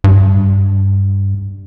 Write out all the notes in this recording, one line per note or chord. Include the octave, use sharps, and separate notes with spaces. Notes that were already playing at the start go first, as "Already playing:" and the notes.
G2